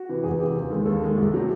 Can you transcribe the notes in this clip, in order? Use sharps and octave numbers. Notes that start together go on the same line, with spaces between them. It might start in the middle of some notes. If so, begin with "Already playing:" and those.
Already playing: F#4
C3 E3
E2 G#4
C3 E3
D#2
D#3 G#3 A4
D#2 A4
D#3 G#3
C2
C3 F#3 A3